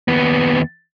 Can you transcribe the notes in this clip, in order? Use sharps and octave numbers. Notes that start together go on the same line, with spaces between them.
D#2 B3